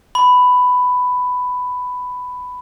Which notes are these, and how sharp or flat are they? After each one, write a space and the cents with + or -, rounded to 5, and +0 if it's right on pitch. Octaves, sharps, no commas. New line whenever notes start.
B5 +10